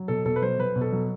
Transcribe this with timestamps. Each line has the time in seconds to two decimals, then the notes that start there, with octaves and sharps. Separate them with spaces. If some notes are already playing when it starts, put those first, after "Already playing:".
Already playing: F#3
0.08 B2 A4
0.26 B2 A4
0.36 B4
0.42 F#3 C5
0.58 F#3 B4
0.76 B2
0.81 A4
0.92 F#3